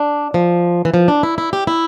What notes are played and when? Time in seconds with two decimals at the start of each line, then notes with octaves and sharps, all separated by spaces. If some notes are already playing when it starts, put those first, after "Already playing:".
Already playing: D4
0.34 F3
0.85 E3
0.94 F3
1.08 D4
1.23 E4
1.38 E4
1.53 G4
1.67 E4